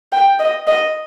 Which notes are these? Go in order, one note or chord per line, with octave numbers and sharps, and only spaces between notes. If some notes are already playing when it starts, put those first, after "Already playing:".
G5
D#5
D#5